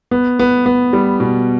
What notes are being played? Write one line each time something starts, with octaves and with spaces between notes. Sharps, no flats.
B3
B3
B3
G3
B2